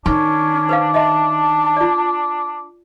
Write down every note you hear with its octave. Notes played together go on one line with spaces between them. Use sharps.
D#3 C#4 D4
B4 C5 F5
D#5 E5 A5 C6
F4 D5